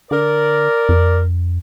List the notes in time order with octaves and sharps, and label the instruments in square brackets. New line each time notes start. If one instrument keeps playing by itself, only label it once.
[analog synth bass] D3 [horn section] A#4 D5
[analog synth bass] F2